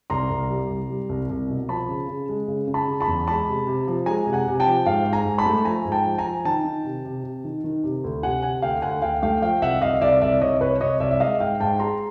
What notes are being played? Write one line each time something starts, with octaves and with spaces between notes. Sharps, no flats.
C2 A#5 C6
C2
G3
C2
G3
C2
C2
B2
F3 A5 B5
C#3
C#3
G#3
C#3
C#3
A5 B5
C#3
A5 B5
E2
G#3 A5 B5
C3
C3
F3
G#3 G#5 A#5
C3
F#5 G#5
C3
G5 A5
F3
G#2 F5 G5
G#2
G#5 A#5
G#2
A5 B5
A3
F3 G#5 A#5
G#2
G5 A5
F3
G#5 A#5
F3
D#3 G5 A5
D#3
C3
C3
C3
D#3
D#3
C3
D2
C3 F#5 G#5
C3 F#5 G#5
D2 F5 G5
D2 F#5 G#5
D2 F5 G5
A3 F5 G5
F3 F5 G5
C2 E5 F#5
C2 D#5 F5
C2 D5 E5
C2 D5 E5
C2 C#5 D#5
C2 B4 C#5
C2 C#5 D#5
C2 D5 E5
E5
G#3 D#5 F5
G#2 F5 G5
G#2 G5 A5
G#3 A#5 C6